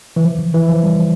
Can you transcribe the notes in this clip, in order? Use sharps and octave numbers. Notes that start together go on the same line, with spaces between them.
E3
F3
E3
E3
F3
G3